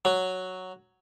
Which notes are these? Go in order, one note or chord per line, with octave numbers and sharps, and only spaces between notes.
F#3